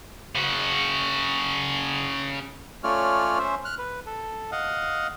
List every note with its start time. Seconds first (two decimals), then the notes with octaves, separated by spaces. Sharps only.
0.36 C#3 F#4
2.84 A3 C#4 F4 C#5 D5 F6
3.39 C#4 C5 E5
3.65 F6 F#6
3.78 B4
4.06 A4
4.52 D#5 F5 F#5